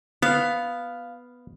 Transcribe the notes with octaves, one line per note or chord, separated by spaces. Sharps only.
B3 F5